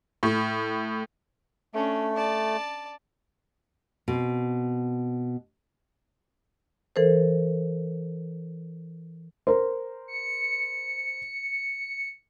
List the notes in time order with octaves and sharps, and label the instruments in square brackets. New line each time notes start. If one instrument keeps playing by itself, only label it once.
[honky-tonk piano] A2
[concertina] A3 [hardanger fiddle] C#4 D4
[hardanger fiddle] D5 A5
[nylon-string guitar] B2 C4
[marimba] E3 A4 A#4 C5
[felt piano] A#4 C5
[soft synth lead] C#7